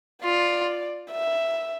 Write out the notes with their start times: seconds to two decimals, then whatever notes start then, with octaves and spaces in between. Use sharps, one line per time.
0.24 F4 D5
1.11 E5